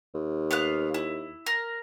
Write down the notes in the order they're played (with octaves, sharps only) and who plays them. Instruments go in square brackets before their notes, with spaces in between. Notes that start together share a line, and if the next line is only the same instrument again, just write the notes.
[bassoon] D#2
[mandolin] B3 F5 F#6
E4
A#4